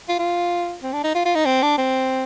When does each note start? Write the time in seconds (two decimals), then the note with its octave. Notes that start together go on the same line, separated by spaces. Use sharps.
0.09 F4
0.19 F4
0.83 C4
0.93 D4
1.04 D#4
1.15 F4
1.25 F4
1.35 D#4
1.45 C4
1.62 D4
1.78 C4